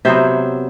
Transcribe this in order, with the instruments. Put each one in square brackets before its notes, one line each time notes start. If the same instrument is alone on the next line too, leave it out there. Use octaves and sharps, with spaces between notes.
[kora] C3 F#3 B3 C5 E5